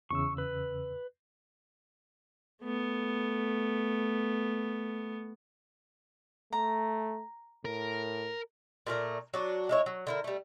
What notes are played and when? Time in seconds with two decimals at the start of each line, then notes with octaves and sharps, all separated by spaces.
0.11 E2 C#3 C#6 E6
0.38 B4
2.62 A3 B3
6.53 A3 A#5
7.65 A2 A#4
8.87 A#2 A3 A#4 D5
9.34 F#3 D4 F#4
9.69 G#3 E4 C#5
9.86 F#3
10.07 D3 E4 A#4
10.24 G3 A3